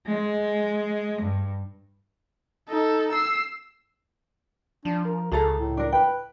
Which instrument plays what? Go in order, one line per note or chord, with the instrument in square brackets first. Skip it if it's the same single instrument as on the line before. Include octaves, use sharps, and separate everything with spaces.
[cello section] G#3
G2
[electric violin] D#4 A4
E6 C7
[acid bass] F3 [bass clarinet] D4
[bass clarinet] A#4
[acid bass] C#2 [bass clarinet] C#3 [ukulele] G#4 A4 A#5
[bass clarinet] A2
[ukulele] D4 A#4
[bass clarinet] B4 [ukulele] G5